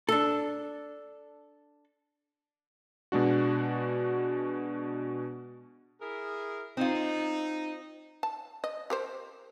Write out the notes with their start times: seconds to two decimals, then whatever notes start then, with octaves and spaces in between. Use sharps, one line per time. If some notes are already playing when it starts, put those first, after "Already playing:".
0.09 D4 A4
3.12 B2 G#3 D4 F#4
6.00 E4 G#4 A#4
6.77 C4 D#4 F4
8.23 A5
8.64 D#5
8.90 G4 A#4 C5